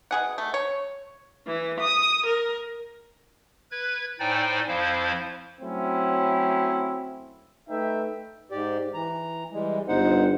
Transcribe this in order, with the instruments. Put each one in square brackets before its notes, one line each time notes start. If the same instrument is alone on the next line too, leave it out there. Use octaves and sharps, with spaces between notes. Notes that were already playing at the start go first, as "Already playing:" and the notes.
[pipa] B2 G#4 F#5
A3
C#5
[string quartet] E3
D#6
A#4
[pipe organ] B4 G#6
A2 D#4 C5 D5 G5 G#5
F2 F3 E4 C5 F5
[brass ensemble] F#3 A3 C4 C#4 E4
A3 D#4 B4 E5 G5
[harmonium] G#2 G4 D5
E3 A#5
E3 G3 G#3
[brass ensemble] G1 [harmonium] D#4 C5 F#5